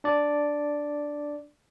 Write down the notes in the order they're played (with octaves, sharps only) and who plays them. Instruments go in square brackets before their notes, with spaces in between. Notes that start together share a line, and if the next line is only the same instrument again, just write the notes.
[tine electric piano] D4 D5